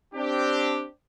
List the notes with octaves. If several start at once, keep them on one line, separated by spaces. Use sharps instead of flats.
C4 D4 G4